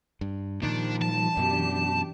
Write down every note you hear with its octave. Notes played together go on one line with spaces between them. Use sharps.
G2
A#2 D#3 F3 G3 D4
A5
F#2 B2 E3 D4 G4